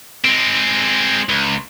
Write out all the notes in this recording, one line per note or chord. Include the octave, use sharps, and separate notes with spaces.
G#3 C4
C#2